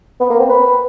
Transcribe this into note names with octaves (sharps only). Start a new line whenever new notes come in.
B3
A#3
C4
B4